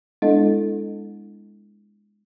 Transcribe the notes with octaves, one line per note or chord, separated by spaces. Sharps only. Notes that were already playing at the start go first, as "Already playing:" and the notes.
G#3 B3 D4 E4 A4 D#5